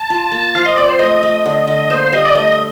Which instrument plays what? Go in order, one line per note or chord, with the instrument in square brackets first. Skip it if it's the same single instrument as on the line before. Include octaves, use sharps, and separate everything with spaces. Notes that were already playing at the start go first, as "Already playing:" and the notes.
Already playing: [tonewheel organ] A5
[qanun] F4
A#3
[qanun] F3 [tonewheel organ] F5
[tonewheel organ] D#5
[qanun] C4 [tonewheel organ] D5
[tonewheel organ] C5
[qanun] A3 [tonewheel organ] D#5
[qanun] A3
D3
D3
[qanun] A#3 [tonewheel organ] C5
[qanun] G3 [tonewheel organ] D#5
[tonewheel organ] D5
[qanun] A3 [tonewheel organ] D#5